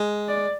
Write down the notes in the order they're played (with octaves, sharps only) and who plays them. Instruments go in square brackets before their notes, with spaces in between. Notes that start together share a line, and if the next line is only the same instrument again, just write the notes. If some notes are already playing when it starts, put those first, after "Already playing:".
Already playing: [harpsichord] G#3
[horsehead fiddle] D5